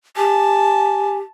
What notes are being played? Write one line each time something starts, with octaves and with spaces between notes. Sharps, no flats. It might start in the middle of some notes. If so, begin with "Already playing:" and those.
G4 G#5 A5